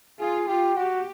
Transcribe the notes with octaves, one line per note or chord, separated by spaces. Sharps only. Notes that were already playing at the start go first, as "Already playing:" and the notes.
F4 G#4
F4 G4
F#4 G4